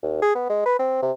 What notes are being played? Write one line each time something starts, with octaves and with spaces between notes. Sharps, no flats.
D#2
G#4
B3
G#3
B4
C4
C3